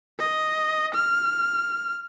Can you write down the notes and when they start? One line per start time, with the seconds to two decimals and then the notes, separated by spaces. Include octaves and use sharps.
0.19 D#5
0.95 F6